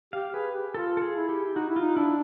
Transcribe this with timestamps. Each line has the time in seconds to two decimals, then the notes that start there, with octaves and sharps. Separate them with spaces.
0.13 G4 F5
0.33 G#4 B4
0.54 G4
0.74 F4 A4
0.97 A4
1.02 G#4
1.15 E4
1.29 G4
1.55 D#4 F#4
1.69 E4
1.76 F4
1.81 D#4
1.97 D4 E4